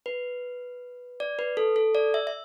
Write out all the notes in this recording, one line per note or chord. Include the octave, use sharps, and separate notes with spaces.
B4
D5
B4
A4
A4
D5
E5
E5